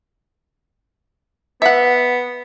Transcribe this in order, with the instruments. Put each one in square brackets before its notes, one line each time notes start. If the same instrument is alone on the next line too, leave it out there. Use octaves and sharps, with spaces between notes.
[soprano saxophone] B3 [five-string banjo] E5 F#5